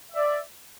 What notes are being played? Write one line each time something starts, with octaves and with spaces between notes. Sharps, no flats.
D5 E5